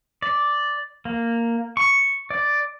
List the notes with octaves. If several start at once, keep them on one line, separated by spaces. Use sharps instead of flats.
D5
A#3
C#6
D5